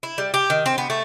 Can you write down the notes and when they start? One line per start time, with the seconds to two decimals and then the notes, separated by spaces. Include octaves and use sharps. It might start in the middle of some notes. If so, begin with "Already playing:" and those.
0.03 E4
0.18 G3
0.34 G4
0.50 D#3
0.66 C4
0.78 B3
0.90 A3